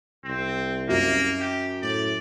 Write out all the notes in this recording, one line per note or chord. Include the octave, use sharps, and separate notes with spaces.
C2 C4
F#2 A#3
G4
A2 D5